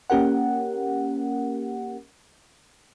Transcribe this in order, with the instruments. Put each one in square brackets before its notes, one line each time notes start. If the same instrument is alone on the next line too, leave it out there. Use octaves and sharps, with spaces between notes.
[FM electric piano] A#3 C#4 G4 A#4 F#5